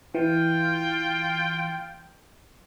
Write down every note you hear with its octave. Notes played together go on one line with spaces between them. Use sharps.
E3 F4 G5